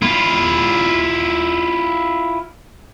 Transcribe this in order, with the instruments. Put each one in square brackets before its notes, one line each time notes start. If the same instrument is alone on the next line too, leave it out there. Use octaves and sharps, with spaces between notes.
[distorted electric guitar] E4 F4